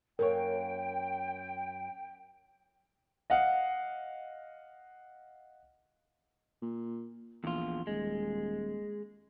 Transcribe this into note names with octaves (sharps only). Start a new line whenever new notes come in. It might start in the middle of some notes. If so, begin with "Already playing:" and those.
F#2 A#3 A#4 C#5 G5
D#5 F5 F#5
A#2
A#1 E2 F4
D#1 G#3